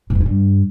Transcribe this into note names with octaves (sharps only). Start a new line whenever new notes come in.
B2
E2
G#2
G2